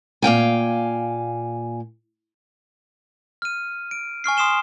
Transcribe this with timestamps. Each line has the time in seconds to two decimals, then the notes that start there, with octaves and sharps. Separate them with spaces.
0.22 A#2 F5 G5 G#5
3.42 F6 D#7
3.91 D7
4.24 G#5 C#6 F6 C7
4.37 C6 D#6 C7 E7 G7